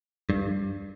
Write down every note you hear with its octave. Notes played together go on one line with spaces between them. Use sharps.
G2